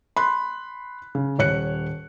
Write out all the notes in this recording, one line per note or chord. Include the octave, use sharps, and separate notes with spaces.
B5 C6 F#6
C#3
D#1 C#5 F#6 C#7